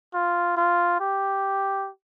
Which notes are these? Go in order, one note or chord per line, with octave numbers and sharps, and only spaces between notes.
F4
F4
G4